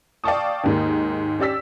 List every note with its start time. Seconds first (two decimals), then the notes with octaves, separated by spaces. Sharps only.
0.24 D5 F5 G5 A5 C#6 D#6
0.64 D#2 G#2 A#3
1.39 C#4 G4 D5 E6 B6